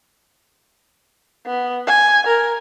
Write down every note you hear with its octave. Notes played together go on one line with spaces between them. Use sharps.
B3
G#5
A#4